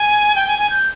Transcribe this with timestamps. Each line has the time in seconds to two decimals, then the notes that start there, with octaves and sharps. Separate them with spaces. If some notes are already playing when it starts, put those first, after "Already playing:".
Already playing: G#5
0.35 G5
0.48 G#5
0.59 G#5
0.70 G6